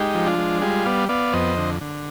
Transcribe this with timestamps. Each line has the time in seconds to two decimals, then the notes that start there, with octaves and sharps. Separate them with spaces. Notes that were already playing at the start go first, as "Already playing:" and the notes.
Already playing: G#3 D#4 G4
0.15 F3
0.26 D4 F4
0.38 G#3
0.62 G3 F4 G#4
0.86 B3 D5 F5
1.09 B3 D5 F5
1.33 F2 C5 D#5
1.57 D3
1.81 D3